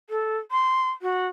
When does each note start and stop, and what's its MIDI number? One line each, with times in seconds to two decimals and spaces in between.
0.10 0.38 69
0.51 0.90 84
1.02 1.27 66